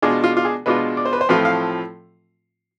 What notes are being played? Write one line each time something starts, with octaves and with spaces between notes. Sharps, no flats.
B2 G#3 D4 F4 G#4
F4
F4
G#4
B2 G#3 D4 F4 B4
D5
C5
B4
C5
A2 F3 A3 C4 F4 B4
F5